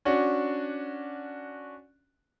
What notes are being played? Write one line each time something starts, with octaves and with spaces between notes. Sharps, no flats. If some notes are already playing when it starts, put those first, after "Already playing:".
C#4 D4 F#4